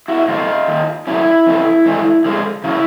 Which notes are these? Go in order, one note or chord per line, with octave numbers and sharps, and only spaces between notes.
E4 F#4
A2 F#3 A3 C4 D#4 F4
D#3 G3 A#3
D3 F#3 A#3 C#4 E4
F2 C#3 E3 A3
G#2 E3 A3 D4
D3 F3 G#3
C#3 F#3 A#3 C#4 E4